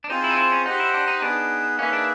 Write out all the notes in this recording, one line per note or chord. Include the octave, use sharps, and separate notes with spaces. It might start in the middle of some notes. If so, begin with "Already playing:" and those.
D4
C4 D#4 F4 G#4 C5
E4
D#4
E4
C#4
D#4 G4 C5 D#5 F#5
E4
D4
D#4
B3 D4 D#4 G#4 B4
A#3 C#4 D#4 G#4 B4 E5
D4